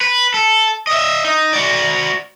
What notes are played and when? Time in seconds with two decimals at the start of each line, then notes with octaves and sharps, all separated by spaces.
0.01 B4
0.34 A4
0.87 D#5 E5
1.25 D#4
1.53 F#4 D5